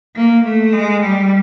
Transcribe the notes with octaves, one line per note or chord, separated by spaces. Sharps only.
A#3
A3
G#3
G3